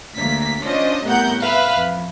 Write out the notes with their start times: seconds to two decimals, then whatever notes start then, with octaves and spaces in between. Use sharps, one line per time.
0.17 D2 A#3 B6
0.63 C#4 D4 F4 C5 D#5
1.05 C2 A2 B3 A#4 F#5 G6
1.41 B4 E5 F5 B5
1.75 F2